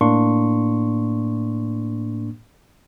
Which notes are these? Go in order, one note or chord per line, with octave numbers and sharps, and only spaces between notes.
A2 A#3 D4 C6 C#6